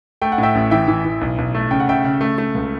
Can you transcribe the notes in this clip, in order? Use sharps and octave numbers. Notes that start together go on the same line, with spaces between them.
A3 G5
F#5
A2
E5 G5
A1
E3 E5 G5
E3
E3
B1
B1
A3
C#3 G5
F#5
C#3 E5 G5
C#3
A3
A3
C#2